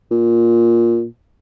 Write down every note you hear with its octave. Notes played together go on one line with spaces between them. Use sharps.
A#2